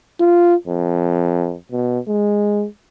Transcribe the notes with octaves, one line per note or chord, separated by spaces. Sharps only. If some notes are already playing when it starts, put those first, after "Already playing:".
F4
F2
B2
G#3